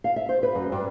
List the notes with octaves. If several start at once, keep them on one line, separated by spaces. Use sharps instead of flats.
F5
E5
C5
B4
F#2
G2